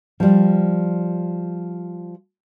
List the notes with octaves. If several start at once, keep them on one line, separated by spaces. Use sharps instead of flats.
F3 G3